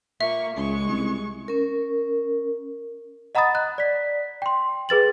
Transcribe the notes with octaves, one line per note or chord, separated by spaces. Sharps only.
A#2 A#3 E5 C#6
C#2 G#3 C#6
C2
C#4 A#4
D#5 F#5 A#5 B5 D#6 A6
F#6
D5 B6
G5 C6
G#4 B4 A6 F#7